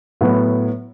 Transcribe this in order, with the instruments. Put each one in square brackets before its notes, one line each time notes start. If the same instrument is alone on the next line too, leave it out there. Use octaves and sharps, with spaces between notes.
[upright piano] A2 F#3 B3